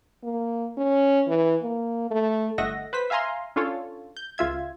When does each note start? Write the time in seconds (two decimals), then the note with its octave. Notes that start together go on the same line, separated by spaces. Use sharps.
0.24 A#3
0.77 C#4
1.27 E3
1.62 A#3
2.11 A3
2.58 G1 A3 D#5 E5 F#5 A#6
2.93 B4 C5 B6
3.10 E5 F5 G#5 A#5 C6
3.56 C#4 D4 F4 A4 C#5
4.17 G6
4.38 C#2 F4 E5 G#6